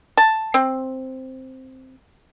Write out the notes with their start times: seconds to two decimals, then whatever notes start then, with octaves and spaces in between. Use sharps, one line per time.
0.17 A5
0.54 C4